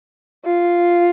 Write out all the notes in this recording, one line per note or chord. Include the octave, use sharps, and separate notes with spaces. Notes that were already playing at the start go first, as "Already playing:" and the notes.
F4